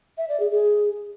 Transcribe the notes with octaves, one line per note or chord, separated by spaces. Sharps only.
E5
D5
G#4
G#4